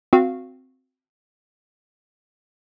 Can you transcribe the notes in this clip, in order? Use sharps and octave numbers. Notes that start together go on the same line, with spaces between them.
C4 F#4 F5